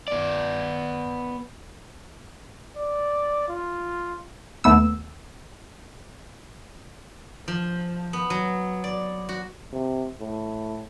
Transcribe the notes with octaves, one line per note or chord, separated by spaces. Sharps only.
B3 D5
D5
F4
D#2 A3 B3 E6
F3
B3
F#3
D5
F#4
C3
A2